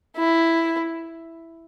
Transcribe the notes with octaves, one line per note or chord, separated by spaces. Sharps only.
E4